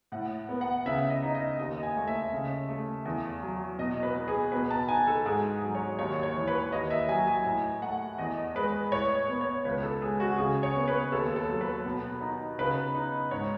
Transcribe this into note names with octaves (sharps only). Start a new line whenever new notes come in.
A2 F#5
B3
F#5
C#3 E5
D#5
D#4
D#5
D#2 D#5
G#5
A3
E5
C#3
A3
E2
F#3
B2 D#5
B4
B3
G#4
B2 B4
A5
D#4 G#5
A4
G#2 G#4
F#3
C#5
D#2 C#5
C#5
E3
B4
D#2 D#5
E5
F#3 G#5
G#5
A2 G#5
A3 F#5
E2 D#5
G#3 B4
A2 C#5
B3
C#5
C#2 B4
A4
G#3 G#4
F#4
C#3 G#4
C#5
B3
B4
D#2 A4
A4
F#3
B4
B2
D#4
C#3 B4
D#4
G#2 C#5